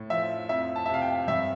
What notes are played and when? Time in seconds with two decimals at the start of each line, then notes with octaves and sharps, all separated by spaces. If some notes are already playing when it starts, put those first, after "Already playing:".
Already playing: A2
0.10 F3 E5
0.49 F2 E5
0.76 A5
0.86 E5
0.89 C3 F5
1.02 G5
1.28 G2 E5